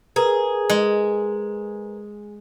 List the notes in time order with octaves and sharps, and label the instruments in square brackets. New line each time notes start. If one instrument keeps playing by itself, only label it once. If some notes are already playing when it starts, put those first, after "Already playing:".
[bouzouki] G#4 [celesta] A#4 B4 A#5
[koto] G#3